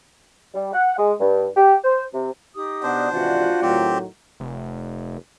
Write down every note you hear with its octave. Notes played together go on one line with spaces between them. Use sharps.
G3
F#5
G#3
G2
G4
C5
C3
D#4 G4 D#6
B2 D4 C5 D5 F#5
G#1 C3 E3 F4 F#4 D5 F#5
A2 D#3 F#3 C4 G4
F1